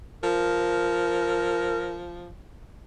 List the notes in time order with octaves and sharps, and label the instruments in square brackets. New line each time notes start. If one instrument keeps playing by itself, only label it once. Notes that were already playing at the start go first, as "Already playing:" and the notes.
[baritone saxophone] F3 [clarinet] A#4